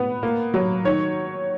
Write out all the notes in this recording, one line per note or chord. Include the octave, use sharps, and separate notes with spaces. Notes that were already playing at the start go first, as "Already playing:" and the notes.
Already playing: B3 B4
A#3
F#3
D#3 C#5